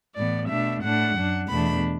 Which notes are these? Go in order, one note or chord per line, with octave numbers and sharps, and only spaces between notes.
A2 E3 B3 D5
B2 A3 D4 E5
A2 A3 D4 F#5
F#2 F#3 D4
E2 B2 A3 D4 B5